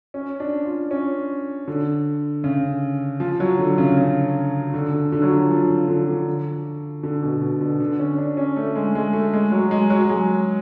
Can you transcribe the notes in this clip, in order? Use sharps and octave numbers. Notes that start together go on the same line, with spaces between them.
C#4
D4
F4
C#4
D3
C#3
F3
F#3
D3
C#3
C#3
D3
D3
D3
F#3
F3
F3
F3
D3
D3
D3
B2
B2
D3
D3
C#4
D4
C#4
A3
G#3
G#3
A3
G#3
F#3
G#3
F#3
G#3